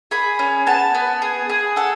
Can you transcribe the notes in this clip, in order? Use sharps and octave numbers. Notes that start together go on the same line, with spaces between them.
G#4 B5
C#4
B3 A5
B3
G#4
G#4
A4 F#5